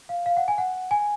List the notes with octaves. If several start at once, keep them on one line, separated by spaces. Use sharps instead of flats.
F5
F5
F#5
G#5
F#5
G#5